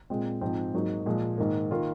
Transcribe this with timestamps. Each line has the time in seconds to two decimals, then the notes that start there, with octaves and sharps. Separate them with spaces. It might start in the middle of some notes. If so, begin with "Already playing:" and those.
0.10 A#2 G#3 C4
0.41 G#2 F3 C4
0.74 G#2 F#3 A#3 D#4
1.06 A#2 F3 G#3
1.38 G#2 D#3 A#3
1.71 D#3 A#3 F4